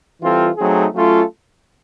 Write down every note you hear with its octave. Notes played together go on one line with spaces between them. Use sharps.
E3 G3 C4 F4 A4
F#3 A3 C4 D#4 G#4
F#3 A3 C#4 F4 A4